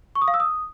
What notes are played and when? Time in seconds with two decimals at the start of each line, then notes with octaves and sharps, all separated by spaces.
0.15 C#6
0.22 D#6
0.28 F5
0.34 E6
0.40 D#6